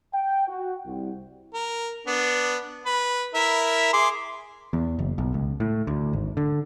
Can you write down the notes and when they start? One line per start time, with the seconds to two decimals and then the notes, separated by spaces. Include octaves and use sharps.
0.14 G5
0.48 F#4
0.86 C2
1.54 A#4
2.07 B3 D4
2.86 B4
3.35 E4 A#4 E5
3.93 G#4 C6 D6
4.73 E2
4.99 F#1
5.18 B1
5.34 C#2
5.60 A2
5.87 D2
6.13 G#1
6.37 D3